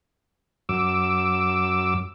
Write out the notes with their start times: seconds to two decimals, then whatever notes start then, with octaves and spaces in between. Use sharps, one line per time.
0.69 F#2 D6 E6